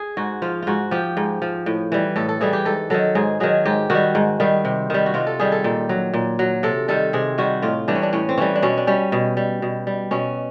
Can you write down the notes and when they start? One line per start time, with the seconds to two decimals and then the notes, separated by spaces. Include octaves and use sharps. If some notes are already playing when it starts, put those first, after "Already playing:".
Already playing: G#4
0.17 G#2 F#4
0.42 F3 F4
0.63 G#2 F4 F#4
0.91 F3 G4
1.17 G#2
1.42 F3
1.66 A2
1.92 E3 G3
2.16 A2 A4
2.29 A4
2.41 E3 G3 G#4
2.53 G4
2.65 G#2 A4
2.90 D#3 F#3 A4
3.15 G#2 G#4
3.40 D#3 F#3 G#4
3.65 G#2 G4
3.90 D#3 F#4
3.95 G3
4.15 G#2
4.40 D#3 G3
4.65 C3
4.90 D#3 G3
5.06 F#4
5.14 C3 F4
5.27 A4
5.39 D#3 G3 G#4
5.52 A4
5.64 A#2
5.89 F#3
6.13 A#2
6.39 F#3
6.63 C3 A4
6.88 D#3 G3 A4
7.13 C3 G#4
7.38 D#3 G3 F#4
7.62 A2 F4
7.88 E3 G3 D4
7.95 C#4
8.03 D4
8.13 A2 C#4
8.29 C4
8.37 E3 G3 C#4
8.56 D4
8.63 B2 C#4
8.77 D4
8.87 G3 C#4
9.12 B2
9.37 G3
9.62 B2
9.87 G3
10.11 B2 C#4